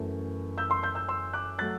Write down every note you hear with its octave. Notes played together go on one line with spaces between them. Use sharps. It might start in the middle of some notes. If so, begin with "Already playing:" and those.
Already playing: F#2 E3 A3
E6 G6
C6 E6
E6 G6
E6 G6
C6 E6
D6 F#6
F#3 A3 F#6 A6